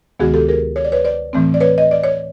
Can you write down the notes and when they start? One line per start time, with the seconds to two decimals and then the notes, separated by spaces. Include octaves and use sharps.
0.19 D2 C3 D#3 G#3 B3 F#4 G#4
0.34 G4 A4
0.49 G#4 A#4
0.76 C#5
0.85 D5
0.92 B4 C#5
1.05 C5 D5
1.33 A2 E3 A3 C4
1.54 D5
1.60 B4 C#5
1.78 D#5
1.91 D5
2.04 C#5